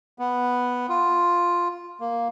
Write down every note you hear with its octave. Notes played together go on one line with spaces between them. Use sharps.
B3
F4
A#3